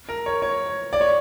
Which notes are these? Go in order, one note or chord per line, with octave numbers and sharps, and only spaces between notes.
A#4
C#5
C#5
D5
C#5